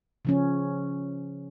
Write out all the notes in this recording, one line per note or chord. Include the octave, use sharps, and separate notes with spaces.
C#3 F3 C#4